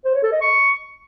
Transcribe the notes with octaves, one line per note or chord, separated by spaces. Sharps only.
C5
C#5
A4
D#5
C#6